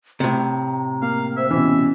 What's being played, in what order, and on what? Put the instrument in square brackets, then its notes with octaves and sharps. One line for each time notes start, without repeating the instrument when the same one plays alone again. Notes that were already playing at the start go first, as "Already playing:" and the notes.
[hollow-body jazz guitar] A2 C3 [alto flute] A#5
[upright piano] A#3 [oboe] F5
[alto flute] C5 [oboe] E5
[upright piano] B2 E3 [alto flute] C#4